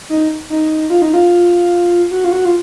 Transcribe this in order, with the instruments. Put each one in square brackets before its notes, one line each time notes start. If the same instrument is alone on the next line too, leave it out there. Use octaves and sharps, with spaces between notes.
[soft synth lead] D#4
D#4
F4
D#4
F4
F#4
F4
F#4
F4